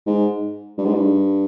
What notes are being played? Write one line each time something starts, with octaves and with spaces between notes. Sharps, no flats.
G#2
G2
G#2
G2